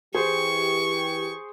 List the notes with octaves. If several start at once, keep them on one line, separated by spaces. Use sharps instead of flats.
E3 G4 G#4 C5 C#6